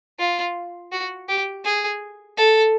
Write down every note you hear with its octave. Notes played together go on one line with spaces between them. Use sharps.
F4
F#4
G4
G#4
A4